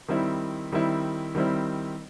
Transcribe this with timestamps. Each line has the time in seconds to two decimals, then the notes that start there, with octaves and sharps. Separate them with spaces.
0.08 D#3 G3 C4 E4
0.72 D#3 G3 C4 E4
1.35 D#3 G3 C4 E4